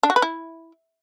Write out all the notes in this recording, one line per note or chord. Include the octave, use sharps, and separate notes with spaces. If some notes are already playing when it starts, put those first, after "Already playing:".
D4
F#4
B4
E4